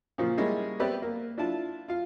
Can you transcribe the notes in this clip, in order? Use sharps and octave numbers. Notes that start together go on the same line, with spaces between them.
A#2 C#3 F3
G3 G#3 A#3 C#4 E4 G#4
B3 C4 G4 B4 D5 E5
A#3
D4 E4 F4 A5
F4 F5